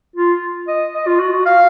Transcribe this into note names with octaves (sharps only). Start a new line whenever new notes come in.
F4
D#5
D#5
F4
F#4
F#4
F5